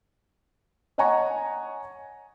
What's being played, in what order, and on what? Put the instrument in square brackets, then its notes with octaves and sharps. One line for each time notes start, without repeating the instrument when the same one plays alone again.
[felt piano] C#5 D#5 F#5 G#5 A#5 C#6